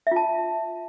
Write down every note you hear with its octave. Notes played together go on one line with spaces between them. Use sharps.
F4 E5 A5